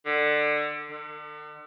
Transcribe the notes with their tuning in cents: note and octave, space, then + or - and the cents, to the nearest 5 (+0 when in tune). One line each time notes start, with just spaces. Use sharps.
D3 +20
D3 +40